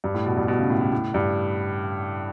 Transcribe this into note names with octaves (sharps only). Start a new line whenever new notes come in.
G2
A2
B2
G2
B2
C#3
A2
A2
A2
G2